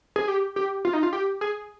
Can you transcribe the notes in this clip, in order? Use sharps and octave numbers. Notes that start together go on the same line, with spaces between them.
G#4
G4
G4
F4
D#4
F4
G4
G#4